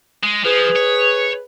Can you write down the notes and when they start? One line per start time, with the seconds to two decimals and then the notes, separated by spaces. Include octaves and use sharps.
0.23 G#3
0.45 F3 G#4 B4
0.76 C#5